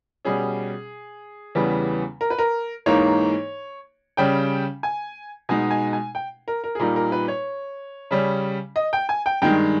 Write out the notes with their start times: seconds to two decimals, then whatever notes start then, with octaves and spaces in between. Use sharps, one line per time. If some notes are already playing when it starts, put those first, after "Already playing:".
0.25 B2 G3 C#4 G#4
1.55 E2 C#3 E3 G3 B3
2.21 A#4
2.30 B4
2.39 A#4
2.86 G#2 E3 A#3 D#4 C#5
4.17 C#3 G3 C#4 G5
4.83 G#5
5.49 B2 G#3 D#4 G#5
5.70 G#5
5.93 G#5
6.15 G5
6.48 A#4
6.64 A#4
6.75 G#4
6.80 A#2 G3 A#3 D#4 A#4
6.96 A#4
7.12 B4
7.28 C#5
8.11 C#3 G3 C#4
8.76 D#5
8.93 G5
9.09 G#5
9.26 G5
9.42 G2 D#3 G#3 G5